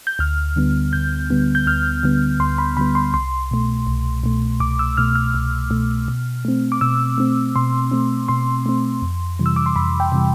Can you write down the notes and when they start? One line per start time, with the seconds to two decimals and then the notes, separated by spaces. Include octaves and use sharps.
0.07 G6
0.19 D2 F6
0.56 D3 G3 B3
0.93 D2 G6
1.30 D3 G3 B3
1.55 G6
1.67 D2 F6
2.03 D3 G3 B3
2.40 D2 C6
2.58 B5
2.77 D3 G3 B3 B5
2.95 C6
3.14 C2 C6
3.51 B2 A3
3.87 C2
4.23 B2 A3
4.60 C2 D6
4.79 E6
4.97 B2 A3 F6
5.15 F6
5.34 C2
5.71 B2 A3
6.08 B2
6.45 A3 C4
6.72 D6
6.81 B2 E6
7.18 A3 C4
7.56 B2 C6
7.91 A3 C4
8.28 B2 C6
8.66 A3 C4
9.02 F2
9.39 C3 E3 G3
9.46 E6
9.56 D6
9.66 C6
9.76 F2 B5
10.00 G5
10.12 C3 E3 G3